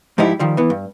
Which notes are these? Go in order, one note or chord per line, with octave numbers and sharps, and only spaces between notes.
G#2 F3 G3 D#4 E4 G4
D#3 F3 G3
E3 B3
G2